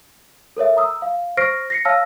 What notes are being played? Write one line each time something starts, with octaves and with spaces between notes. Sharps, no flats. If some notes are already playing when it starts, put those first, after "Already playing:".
A4 A#4 C#5 E5
A#5 D#6 E6
F5
C5 C#6 F6 A#6 C7 D7
A#6 C7 C#7
C#5 F5 A5 E6 F6 A#6